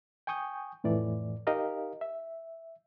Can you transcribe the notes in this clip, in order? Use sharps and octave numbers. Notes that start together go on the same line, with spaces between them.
G5 G#5 C#6 D#6 G6
F2 A2 E3 D5
D#4 G4 A#4 D#5 F5
E5